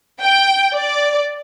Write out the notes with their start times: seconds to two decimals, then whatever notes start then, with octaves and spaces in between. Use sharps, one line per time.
0.22 G5
0.75 D5